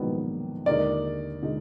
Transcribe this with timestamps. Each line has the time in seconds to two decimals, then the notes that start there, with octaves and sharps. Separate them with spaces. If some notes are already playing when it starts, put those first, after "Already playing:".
Already playing: A#1 G#2 D#3 F#3 B3
0.66 D#2 D3 G#3 D#4 A#4 D5
1.42 D3 G#3 D#4